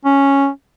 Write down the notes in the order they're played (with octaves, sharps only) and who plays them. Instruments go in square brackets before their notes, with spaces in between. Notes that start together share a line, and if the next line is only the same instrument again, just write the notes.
[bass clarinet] C#4